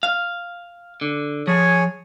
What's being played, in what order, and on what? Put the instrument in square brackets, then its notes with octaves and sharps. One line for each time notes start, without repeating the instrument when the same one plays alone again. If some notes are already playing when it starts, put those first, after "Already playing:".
[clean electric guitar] F5
D3
[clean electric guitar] F3 [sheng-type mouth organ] G#4 C#5 G#5